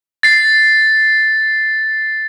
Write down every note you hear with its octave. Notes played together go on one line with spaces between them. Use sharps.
A6 C7